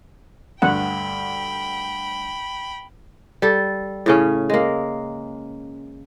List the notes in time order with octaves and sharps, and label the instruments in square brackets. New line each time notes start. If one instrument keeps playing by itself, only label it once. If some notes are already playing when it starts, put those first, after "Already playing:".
[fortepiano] D2 G2 D3 [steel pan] F#5 [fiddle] G5 B5
[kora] G3 A4
A2 C#3 C#4
G#3 A#3